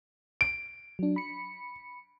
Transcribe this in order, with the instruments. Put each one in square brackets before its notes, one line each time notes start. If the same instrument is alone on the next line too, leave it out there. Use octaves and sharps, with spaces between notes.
[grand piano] D7
[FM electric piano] F#3 D4
B5 C#7